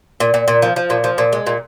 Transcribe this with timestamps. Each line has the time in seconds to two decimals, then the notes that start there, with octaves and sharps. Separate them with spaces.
0.20 A#2
0.34 A#2
0.48 A#2
0.62 F3
0.76 F3
0.90 A#2
1.04 F3
1.18 A#2
1.33 G#3
1.47 A#2